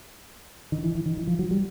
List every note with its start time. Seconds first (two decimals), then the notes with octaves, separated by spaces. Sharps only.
0.72 D#3
0.83 E3
0.95 E3
1.06 D#3
1.18 E3
1.27 F3
1.39 F#3
1.51 G3